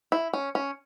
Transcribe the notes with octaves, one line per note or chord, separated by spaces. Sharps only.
E4
C#4
C#4